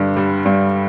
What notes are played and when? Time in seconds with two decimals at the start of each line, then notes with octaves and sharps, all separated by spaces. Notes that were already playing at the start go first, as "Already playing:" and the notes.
Already playing: G2 D3
0.17 G3
0.46 G2